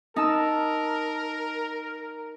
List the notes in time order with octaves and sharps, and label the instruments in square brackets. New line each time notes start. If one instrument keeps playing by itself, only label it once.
[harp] D#4 A5 E6 [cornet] A#4